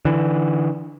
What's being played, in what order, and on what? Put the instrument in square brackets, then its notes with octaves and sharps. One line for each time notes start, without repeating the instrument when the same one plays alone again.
[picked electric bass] D3 E3